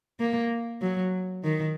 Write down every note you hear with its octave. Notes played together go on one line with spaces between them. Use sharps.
A#3
F#3
D#3